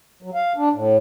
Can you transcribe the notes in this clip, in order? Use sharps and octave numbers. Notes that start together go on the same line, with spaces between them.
F#3
F5
D4
A2